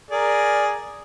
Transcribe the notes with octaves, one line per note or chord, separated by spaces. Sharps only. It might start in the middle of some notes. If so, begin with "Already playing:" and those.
G#4 A#4 D5